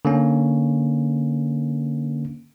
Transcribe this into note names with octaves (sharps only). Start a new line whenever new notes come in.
D3 A#3 C#4